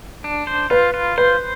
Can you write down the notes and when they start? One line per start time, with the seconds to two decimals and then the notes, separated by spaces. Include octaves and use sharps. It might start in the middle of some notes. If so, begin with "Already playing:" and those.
0.24 D4
0.47 C5
0.70 F4 B4
0.94 F4
1.18 B4 C5